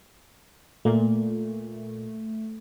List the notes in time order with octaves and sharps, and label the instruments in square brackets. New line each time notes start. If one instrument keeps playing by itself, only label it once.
[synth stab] A#2 [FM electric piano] A3